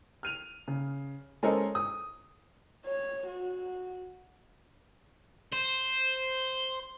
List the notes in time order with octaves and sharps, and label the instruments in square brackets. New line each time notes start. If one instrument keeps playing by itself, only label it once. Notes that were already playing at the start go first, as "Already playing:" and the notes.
[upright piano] F6 D#7 F7
C#3
G#3 C#4 A4 A#4 C5 D#5
D#6
[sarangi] C#5
F#4
[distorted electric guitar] C5